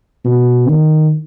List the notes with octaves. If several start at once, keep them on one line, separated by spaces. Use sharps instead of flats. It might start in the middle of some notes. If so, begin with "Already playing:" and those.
B2
D#3